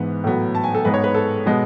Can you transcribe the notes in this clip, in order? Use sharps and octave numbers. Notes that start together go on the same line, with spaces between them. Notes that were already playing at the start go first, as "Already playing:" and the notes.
Already playing: G#2 E3 B3
A2 F#3 B3
A5
G#5
A4
G#2 G#3 B3 B4
C#5
B4
A4
B2 G#3 B3